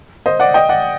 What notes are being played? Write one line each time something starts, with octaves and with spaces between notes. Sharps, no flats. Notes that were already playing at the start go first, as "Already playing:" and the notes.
C5 D#5
D5 F#5
D#5 G5
D5 F#5